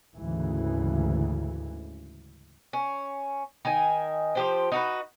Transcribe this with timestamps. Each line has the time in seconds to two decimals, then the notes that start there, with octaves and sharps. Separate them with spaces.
0.20 D2 G#2 C#3 E3
2.73 C#4
3.65 D#3 D#4 G#5
4.35 F3 G4 C5
4.72 D#4 F#4 B4